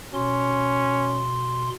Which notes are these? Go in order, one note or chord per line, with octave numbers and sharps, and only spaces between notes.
B2 C#4 C6